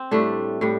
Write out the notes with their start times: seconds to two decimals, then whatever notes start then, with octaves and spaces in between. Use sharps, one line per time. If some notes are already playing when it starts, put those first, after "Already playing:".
Already playing: C4
0.11 A2 G3 A3 D4
0.61 A2 G3